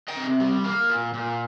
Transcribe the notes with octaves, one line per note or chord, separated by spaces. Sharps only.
D#5 G5
C3
G3
A#3
A#2
A#2